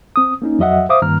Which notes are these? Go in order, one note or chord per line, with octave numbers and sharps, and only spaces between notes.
C4 D#6
A#3 C#4 D#4
F2 F#3 F#4 D#5 E5 F#5
C5 E5 F5 D6 D#6
G2 D#3 A#3 A#5 F6